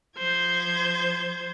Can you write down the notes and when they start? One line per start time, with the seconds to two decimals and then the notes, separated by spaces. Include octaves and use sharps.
0.18 F3 C5 G6 G#6